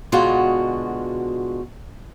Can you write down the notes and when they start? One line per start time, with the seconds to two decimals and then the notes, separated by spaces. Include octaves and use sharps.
0.12 B2 D3 G#3 F4 F#4